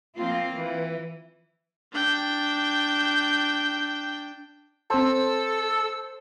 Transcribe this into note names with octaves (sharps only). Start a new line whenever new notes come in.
F3 A#3 C4 F4
E3
D4 G5
C4 A4 C5 A5 E6